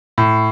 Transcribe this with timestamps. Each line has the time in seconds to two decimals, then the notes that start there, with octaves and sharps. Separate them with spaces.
0.18 A2